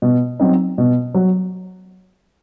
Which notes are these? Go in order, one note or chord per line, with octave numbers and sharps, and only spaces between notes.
B2
F#3 C4 D#4
B2
F#3